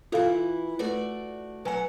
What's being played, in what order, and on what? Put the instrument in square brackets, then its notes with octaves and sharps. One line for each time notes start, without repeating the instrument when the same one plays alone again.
[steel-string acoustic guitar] E3 E4 [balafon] F4 A4 F5
[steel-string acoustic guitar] A3 F#4 D5 [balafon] B4
[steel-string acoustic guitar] F#3 F#5 [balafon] B4 G#5